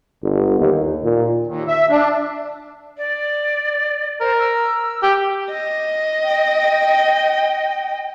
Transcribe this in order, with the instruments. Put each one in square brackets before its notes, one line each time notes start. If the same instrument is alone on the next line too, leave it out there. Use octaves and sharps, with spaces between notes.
[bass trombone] G1
D#2
A#2
[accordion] D#2
E5
D4
[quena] D5
[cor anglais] A#4 [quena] C5
[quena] E6
[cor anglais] G4
[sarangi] D#5
[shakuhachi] G5